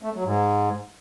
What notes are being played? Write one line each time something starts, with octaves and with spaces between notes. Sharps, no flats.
A3
F#3
G#2